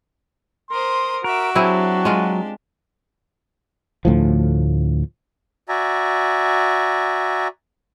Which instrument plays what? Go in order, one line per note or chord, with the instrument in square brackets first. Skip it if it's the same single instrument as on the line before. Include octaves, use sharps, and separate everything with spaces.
[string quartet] A#4 C5 D#6 [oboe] C6
[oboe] F#4 [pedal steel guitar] A#4 [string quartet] E5 D6
[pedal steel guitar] F#3 [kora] C4 E4 G#4 [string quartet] D4 G4
[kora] G#3 F4
[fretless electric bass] D2 A2 F3
[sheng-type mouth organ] F#4 D5 E5 G#5 A#5